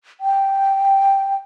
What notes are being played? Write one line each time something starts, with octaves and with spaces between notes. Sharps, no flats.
G5